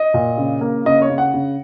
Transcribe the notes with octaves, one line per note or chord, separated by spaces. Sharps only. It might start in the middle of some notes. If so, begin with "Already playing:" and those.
Already playing: D#5
A#2
C#3
A#3
C#3 D#5
C#5
C#3
F#5
C#3